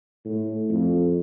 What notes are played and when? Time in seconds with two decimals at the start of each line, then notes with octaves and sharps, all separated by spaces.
0.25 A2
0.69 F2